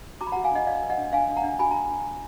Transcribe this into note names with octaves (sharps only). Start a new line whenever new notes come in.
F#4 A#5 D6
B5
F#5 A#5
F#4
F5 G#5
D4 D#5 F#5
F#4 D5 F5
B4
D#5 F#5
D4
D4 F5 G#5
D4
F#5 A#5
D4
F#4 G#5 B5
A#5